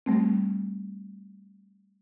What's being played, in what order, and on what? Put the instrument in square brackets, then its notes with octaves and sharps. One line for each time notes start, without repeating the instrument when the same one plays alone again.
[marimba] G3 A3 C4